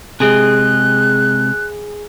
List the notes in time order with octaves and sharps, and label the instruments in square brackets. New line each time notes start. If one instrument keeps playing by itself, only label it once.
[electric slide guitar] C3 G#3 [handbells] G#4 G#5 [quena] F#6